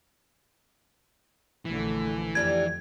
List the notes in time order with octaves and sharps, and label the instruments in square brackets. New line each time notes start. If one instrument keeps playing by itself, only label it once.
[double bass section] A#1 D3 A3 [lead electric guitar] E3
[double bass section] F2 [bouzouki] G3 D4 G4 [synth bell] G#6